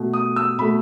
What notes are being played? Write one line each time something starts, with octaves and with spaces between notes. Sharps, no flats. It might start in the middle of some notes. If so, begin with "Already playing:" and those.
Already playing: B2 A3
D#6
E6
B2 A3 B5